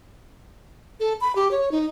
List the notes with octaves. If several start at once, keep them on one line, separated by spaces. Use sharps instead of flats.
A4
B5
G4
C#5
D#4